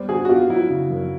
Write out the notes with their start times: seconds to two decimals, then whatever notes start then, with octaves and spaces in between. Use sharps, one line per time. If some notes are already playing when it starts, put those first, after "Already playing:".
Already playing: G3 B3 C5 D5
0.09 D3 F#4 G#4
0.25 F#4
0.29 B3 F4 G4
0.49 F#3 E4 F#4
0.70 C#3
0.90 F#2